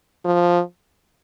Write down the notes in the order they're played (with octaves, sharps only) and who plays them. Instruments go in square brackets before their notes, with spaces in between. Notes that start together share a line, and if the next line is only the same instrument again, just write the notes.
[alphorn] F3